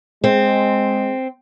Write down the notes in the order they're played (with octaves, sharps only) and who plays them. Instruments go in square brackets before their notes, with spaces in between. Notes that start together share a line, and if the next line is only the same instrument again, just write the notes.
[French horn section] G#3 [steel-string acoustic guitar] C4